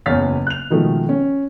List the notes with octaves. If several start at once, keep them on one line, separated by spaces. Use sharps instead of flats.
F#1 E2 C#5 F6 A6 B6
F#6 F7
B2 D#3 F3 G#3 A3
C#4